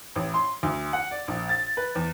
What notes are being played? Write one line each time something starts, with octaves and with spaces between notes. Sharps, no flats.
A1
C6
D2
F#5
D5
A#1
A6
B4
E2